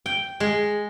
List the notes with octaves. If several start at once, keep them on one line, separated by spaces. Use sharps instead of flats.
G5
G#3